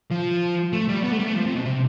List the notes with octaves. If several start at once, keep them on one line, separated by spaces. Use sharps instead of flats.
F3
A3
G3
B3
A3
G3
A3
F3
C3
B2
C3